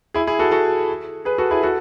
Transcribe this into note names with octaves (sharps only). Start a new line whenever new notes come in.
E4 G#4
E4 G#4
F#4 A4
F#4 A4
G#4 B4
F#4 A4
E4 G#4
F#4 A4